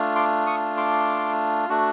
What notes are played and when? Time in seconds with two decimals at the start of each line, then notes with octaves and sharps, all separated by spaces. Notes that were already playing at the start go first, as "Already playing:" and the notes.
Already playing: A3 D4 F4
0.16 C6 D6
0.46 C#6 D#6
0.77 C6 D6
1.69 A3 D4 F#4